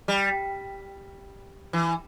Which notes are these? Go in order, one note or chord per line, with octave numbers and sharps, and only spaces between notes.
G3
E3